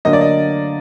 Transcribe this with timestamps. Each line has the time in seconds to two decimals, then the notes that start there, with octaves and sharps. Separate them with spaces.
0.05 D3 F#3 A#3 D#5
0.13 D5
0.21 D#5